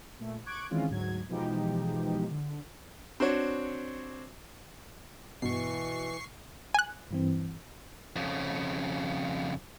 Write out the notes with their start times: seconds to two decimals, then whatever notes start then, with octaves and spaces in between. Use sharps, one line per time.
0.19 A#2 A3
0.46 C#6 D6 F#6 G#6 D7
0.70 D#3 E3 G#3 C4 C#4 F4
0.89 D2 G#2 F#3 G#6
1.28 B2 E3 F3 G#3 D#4 G4
2.31 D3
3.20 C4 D4 F#4 C#5
5.42 G2 B2 E3 B3 C#6 C7
6.74 G#5 F#6
7.11 G2 E3 C4
8.16 F2 C#3